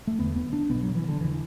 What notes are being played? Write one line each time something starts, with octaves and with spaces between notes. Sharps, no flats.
A3
E1 E2 D3 B3
B3
D4
B1 B2 B3
F#3
E3
D3
E1 D3 E3